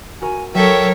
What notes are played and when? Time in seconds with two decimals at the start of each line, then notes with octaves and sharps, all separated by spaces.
0.22 F#4 A#4 G#5
0.54 F#3 A4 A#4 C#5 E5 G5